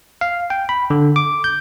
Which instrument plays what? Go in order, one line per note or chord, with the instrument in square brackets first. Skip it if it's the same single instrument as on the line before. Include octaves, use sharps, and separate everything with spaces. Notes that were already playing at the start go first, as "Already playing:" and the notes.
[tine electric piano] F5
G5
B5
D3
D6
G6